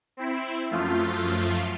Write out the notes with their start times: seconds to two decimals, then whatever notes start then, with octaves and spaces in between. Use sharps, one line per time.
0.17 C4 E4
0.71 F#2 F3 A3 F4